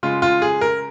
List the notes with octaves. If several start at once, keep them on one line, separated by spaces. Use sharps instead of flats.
C#3 G#3 F4
F4
G#4
A#4